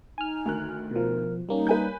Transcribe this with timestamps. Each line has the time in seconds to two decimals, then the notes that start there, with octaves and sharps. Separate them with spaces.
0.18 D#4 G#5 F6
0.46 D2 D#3 F#6
0.91 B2 F3 A#4
1.49 G3 A#3 C#4 D#4
1.67 B4 G#5 G6